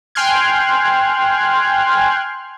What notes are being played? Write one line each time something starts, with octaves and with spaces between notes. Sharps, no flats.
G5 G#5 C6 F6 F#6 G#6